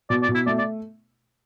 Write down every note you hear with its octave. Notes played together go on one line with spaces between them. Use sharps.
B2 D5
D5
B2
E4
A3 D5
D5